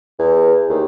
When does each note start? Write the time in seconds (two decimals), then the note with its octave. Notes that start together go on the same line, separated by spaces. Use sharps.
0.19 E2
0.69 D#2